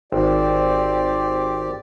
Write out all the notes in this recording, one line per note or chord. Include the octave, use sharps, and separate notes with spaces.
G#1 C4 G4 D5